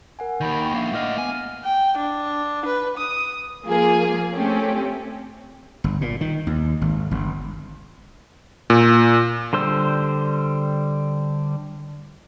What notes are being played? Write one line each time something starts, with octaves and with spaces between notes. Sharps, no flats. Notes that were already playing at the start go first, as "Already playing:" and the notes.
A#4 F#5 G#5
D#2 D#3 B5 G6
G5 C#6
A#3 D4 E5 F5 C7
A2 D#5 F#5 D6 F6
B3 G#5
G5
D4
B4
D#6
F3 A#3 F4 G#4
A3 C4 C#4 G4
G1
A#2
D#3
D#2
G#1
G1
A#2
D3 G3 C5 E6